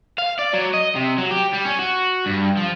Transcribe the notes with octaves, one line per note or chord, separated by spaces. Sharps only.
F5
D5
F#3
D#5
C3
F#3
G4
G3
C#4
F#4
G2
F3